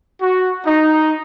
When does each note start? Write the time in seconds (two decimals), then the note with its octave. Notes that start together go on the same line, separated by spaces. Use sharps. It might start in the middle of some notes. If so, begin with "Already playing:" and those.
0.22 F#4
0.65 D#4